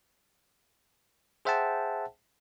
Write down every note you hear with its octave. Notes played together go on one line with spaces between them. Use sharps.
G#4 C5 E5 F#5 G5 A5